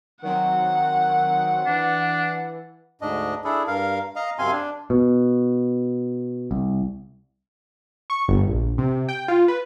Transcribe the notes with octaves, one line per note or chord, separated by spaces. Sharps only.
D#3 F#3 C4 F#5
E3 D4
D2 G#2 D4 D#5
D4 E4 G#4 A4
G2 A#4 F5
D#5 F5 A#5
F#2 C3 C4 F5 G#5 C6
D4
B2
C2
C#6
G1
A#1
C3
G5
F4
B4